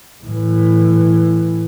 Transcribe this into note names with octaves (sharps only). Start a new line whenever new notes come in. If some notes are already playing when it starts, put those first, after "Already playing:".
A2 E3